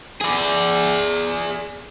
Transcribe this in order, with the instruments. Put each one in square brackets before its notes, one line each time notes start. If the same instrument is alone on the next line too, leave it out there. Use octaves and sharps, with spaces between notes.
[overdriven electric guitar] G#4 D5